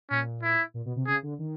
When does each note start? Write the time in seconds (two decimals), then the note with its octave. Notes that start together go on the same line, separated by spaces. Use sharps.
0.11 A#2 C#4
0.43 E4
0.74 A#2
0.85 B2
0.96 C3
1.07 C#3 G#4
1.23 D3
1.39 D#3